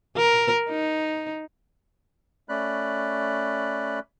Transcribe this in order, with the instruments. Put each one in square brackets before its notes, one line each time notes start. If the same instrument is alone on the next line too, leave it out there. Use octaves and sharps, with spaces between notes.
[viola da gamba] A#4
D#4
[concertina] A3 C#4 D5 B5 F#6